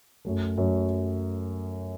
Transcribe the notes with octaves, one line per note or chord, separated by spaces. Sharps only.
F#2 F#3 A3
F#2 F#3 A3